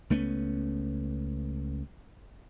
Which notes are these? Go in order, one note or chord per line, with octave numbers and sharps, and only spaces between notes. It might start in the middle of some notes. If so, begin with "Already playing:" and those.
C#2 A3 B3 C#4